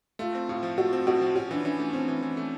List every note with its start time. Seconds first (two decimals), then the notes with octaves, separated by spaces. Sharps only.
0.19 A3 F4
0.35 C4
0.49 A2 F4
0.63 F3
0.78 A3 F#4
0.93 C4
1.07 A2 F#4
1.21 F3
1.36 C#4 F#4
1.51 E3 D4
1.64 E3 C#4
1.80 A3
1.93 C4 C#4
2.08 E3
2.22 E3
2.37 A3